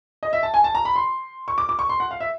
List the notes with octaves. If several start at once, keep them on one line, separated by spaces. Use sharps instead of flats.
D#5
E5
A5
G#5
A5
A#5
B5
C6
C#6
D6
D6
C#6
C6
F#5
F5
E5